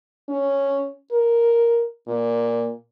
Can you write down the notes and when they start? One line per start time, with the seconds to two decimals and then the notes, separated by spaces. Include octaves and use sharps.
0.29 C#4
1.12 A#4
2.08 A#2